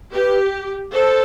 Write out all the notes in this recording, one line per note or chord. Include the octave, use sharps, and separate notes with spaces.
G4 B4
A4 C5